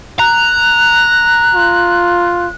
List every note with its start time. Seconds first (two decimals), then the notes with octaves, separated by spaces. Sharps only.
0.19 A#5 F#6
1.54 F4